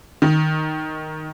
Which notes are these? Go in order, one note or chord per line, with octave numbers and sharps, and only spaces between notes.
D#3